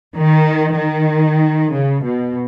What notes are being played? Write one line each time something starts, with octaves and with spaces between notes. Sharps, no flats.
D#3
D#3
C#3
B2